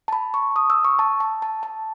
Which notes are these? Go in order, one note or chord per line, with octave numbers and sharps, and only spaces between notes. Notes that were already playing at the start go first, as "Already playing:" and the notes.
A5
B5
C#6
D#6
E6
C#6
A5
A5
A5
A5